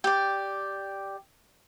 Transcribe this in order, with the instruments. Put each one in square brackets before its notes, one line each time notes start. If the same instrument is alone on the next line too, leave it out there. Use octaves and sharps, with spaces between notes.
[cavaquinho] G4 D5